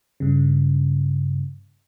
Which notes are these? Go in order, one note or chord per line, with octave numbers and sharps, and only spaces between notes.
G2 C#3